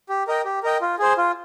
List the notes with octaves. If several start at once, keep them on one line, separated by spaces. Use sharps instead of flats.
G4
A#4 D#5 G5
G4
A#4 D#5 G5
F4
G#4 C5
F4